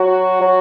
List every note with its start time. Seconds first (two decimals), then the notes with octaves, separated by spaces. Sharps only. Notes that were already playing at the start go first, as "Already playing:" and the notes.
Already playing: F#3 F#4
0.41 F#3